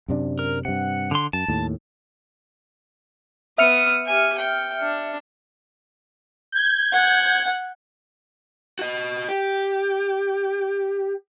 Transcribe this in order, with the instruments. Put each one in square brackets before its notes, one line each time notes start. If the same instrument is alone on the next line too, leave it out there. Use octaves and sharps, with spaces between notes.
[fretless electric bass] F#2 C3 D4
[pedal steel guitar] A#4
[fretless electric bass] G2 C3 [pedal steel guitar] F#5
[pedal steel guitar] D3 C6
[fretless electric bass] F#2 [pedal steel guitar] A5
[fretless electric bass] D#2 A2
[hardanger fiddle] B3 D#6 [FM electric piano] E5 F6 C#7
[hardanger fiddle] G4 G#5
G5
D4
[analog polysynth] G6 G#6
[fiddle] F#5
[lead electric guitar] F#4 D#5
G4